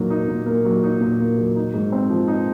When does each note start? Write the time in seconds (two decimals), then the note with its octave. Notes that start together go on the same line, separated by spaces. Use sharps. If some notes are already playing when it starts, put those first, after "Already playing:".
Already playing: A#2 F#3 A#3 D#4
0.10 D#4
0.28 A#2
0.46 A#3
0.65 F#3
0.83 D#4
1.01 A#2
1.20 A#3
1.37 F#3
1.56 D#4
1.74 G#2
1.92 C4
2.10 F3
2.27 D#4